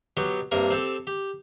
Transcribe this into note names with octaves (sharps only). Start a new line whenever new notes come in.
B2 F#3 G4
G2 C3 A#3
C4 G4 A4
G4